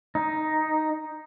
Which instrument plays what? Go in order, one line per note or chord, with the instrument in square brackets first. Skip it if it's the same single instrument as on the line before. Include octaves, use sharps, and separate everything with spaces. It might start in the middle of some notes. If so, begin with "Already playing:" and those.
[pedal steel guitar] D#4